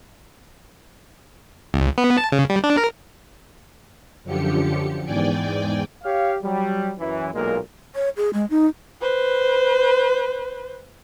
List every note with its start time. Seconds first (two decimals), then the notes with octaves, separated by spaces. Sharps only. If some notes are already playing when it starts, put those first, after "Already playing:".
1.74 C#2
1.98 B3
2.17 A5
2.32 C#3
2.50 G3
2.64 D4
2.77 A#4
4.24 F#2 D3 F3 G4 C#7
5.04 E2 G#2 D5 G5 G#5
6.03 G4 C#5 F5
6.43 F#3 G3
6.99 F#2 E3
7.33 B1 A#2 G#3 A#3 A#4
7.95 C#5
8.17 G#4
8.33 G#3
8.50 D#4
9.01 B4 C5